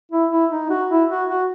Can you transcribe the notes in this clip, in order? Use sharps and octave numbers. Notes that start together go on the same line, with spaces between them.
E4
E4
D#4
F#4
E4
F#4
F#4